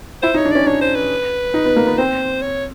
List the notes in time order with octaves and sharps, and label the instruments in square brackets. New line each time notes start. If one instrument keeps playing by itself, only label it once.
[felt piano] E4 [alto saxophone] C5
[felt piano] D#4
[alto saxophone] C#5
[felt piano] D4
[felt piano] C#4 [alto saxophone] D5
[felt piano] D4 [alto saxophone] C#5
[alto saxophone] C5
B4
[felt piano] D#4
B3
A#3
B3
[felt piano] C4 [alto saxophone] C5
[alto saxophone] C#5